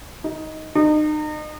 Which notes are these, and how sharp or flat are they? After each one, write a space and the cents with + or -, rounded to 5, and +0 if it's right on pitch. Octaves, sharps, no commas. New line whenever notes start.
D#4 +10
D#4 -35